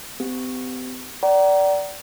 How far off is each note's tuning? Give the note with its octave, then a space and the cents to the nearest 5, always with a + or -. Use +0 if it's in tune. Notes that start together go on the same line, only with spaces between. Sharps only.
C4 -45 G4 +0
D5 -15 F#5 +45 A#5 +15